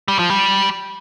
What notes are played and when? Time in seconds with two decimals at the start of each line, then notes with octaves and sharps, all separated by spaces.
0.08 G3
0.19 F3
0.30 G3